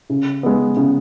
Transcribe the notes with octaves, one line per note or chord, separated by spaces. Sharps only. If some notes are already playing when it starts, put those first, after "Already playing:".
C#3
G#3 B3
C#3